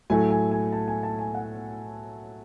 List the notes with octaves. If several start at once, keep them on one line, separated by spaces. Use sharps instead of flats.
A2 F#3 A3 G#5
G#5
G#5
A5
G#5
A5
G#5
F#5